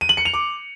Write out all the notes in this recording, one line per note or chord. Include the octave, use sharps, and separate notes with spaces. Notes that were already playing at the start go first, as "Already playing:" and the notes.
D#7
F#7
C#7
F7
D6